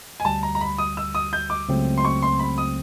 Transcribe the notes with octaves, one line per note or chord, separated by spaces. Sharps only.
G#5
D2 D3 G3 A5
A#5
A#5
B5
D#6
E6
D#6
G6
D6
C#2 C#3 F#3 A3 C4
C6
C#6
C6
B5
D#6